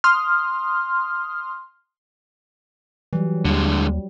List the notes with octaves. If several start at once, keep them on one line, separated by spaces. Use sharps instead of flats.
C6 D#6 F6
E3 F#3 G3
D#2 D3 G3 G#3